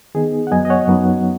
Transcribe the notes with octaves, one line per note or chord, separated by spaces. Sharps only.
D#3 B3 D#4 G#4
F#5
F#2 F#3 B3 D#5 G#5
D#5
C#5 F#5
F#2 F#3 B3 D#4